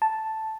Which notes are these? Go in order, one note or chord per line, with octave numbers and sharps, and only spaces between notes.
A5